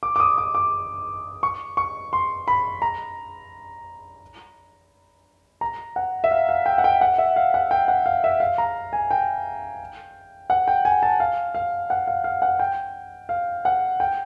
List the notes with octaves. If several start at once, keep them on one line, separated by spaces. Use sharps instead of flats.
D6
D6
D#6
D6
D6
C#6
C#6
C6
B5
A#5
A#5
F#5
E5
F5
F5
G5
F#5
G5
F#5
E5
F5
F#5
G5
F#5
F5
E5
F5
A#5
G#5
G5
F#5
G5
G#5
A5
F5
F5
F#5
F5
F5
F#5
G5
F5
F#5
G5